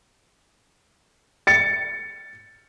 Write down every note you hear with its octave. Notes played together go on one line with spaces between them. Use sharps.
A6 C#7